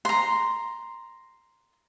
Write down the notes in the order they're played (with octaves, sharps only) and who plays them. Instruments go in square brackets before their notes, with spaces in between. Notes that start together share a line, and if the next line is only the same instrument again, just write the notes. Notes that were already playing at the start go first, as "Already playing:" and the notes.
[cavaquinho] A#5 C6